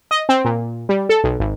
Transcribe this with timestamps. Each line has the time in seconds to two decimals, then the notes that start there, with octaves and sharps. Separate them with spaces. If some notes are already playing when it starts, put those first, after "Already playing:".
0.11 D#5
0.29 C4
0.45 A#2
0.89 G3
1.09 A4
1.24 B1
1.40 G#1